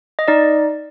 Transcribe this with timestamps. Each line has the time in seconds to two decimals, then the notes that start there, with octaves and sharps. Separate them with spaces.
0.19 D#5
0.28 D#4 D5